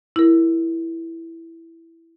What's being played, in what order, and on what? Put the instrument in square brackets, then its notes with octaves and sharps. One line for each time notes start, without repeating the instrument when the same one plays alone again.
[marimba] E4 A#4